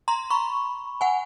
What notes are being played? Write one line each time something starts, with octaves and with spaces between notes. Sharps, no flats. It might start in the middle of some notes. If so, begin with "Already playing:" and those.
A#5 C6
B5 C#6
F#5 G#5